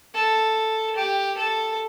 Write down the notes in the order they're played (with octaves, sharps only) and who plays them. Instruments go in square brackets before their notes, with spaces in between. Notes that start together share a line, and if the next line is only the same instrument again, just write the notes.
[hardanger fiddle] A4
G4
A4